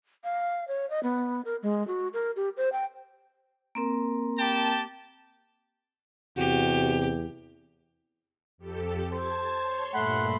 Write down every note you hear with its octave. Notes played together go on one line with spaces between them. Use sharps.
F5
C#5
D#5
B3
A#4
G#3
F#4
A#4
G4
C5
G5
A#3 C4 A#4
G4 G5 A5
E2 C3 F#4 G4
F2 G4 A4
C5 A5 G#6
C#5 C6
G2 A#2 A3 F#5 B5 C6